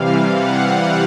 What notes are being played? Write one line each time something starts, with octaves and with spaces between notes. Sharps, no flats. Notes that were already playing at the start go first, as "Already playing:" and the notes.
Already playing: C3 E3 G3 F5
F#5